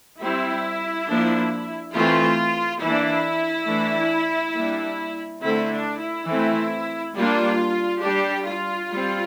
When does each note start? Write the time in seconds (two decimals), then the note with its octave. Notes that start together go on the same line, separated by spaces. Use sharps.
0.20 G3 C4 E4
1.08 F3 A#3 D4
1.94 E3 A3 C4 F4
2.81 E3 A#3 D4 E4
3.67 E3 A3 D4
4.54 G3 A#3 D4
5.41 D3 A3 C4 E4
5.71 D4
5.99 E4
6.28 E3 A3 C4
7.14 G3 A#3 D4 F4
8.01 G3 D4 G4
8.45 F4
8.89 G3 C4